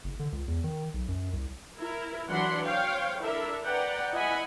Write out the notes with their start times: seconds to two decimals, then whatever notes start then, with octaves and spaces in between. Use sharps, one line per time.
0.04 F#1
0.19 D3
0.32 C#2
0.48 E2
0.64 D#3
0.94 B1
1.08 F#2
1.33 C2
1.80 E4 A#4
2.29 E3 F#3 D4 F#5 B5 C6
2.65 C5 C#5 F5 G5
3.20 D4 E4 A4 A#4 E5
3.63 B4 D5 F#5 G5 A#5
4.12 E4 D#5 F#5 G#5 B5